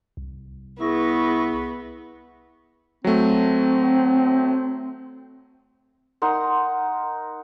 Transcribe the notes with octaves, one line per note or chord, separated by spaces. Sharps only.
C2
B3 E4 G#4 C#6 A#6
F#3 A3 C4
D#4 A#4 F#5 C6